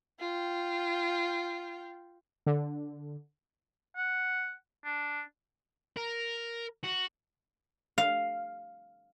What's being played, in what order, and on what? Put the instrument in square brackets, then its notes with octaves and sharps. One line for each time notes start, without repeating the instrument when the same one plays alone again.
[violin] F4 G5
[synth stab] D3
[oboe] F#5
D4
[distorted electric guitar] A#4
F#4
[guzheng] F5